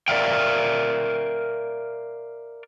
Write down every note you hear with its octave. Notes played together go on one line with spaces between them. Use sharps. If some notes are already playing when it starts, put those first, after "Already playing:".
A#4 D5 E5 F5 G5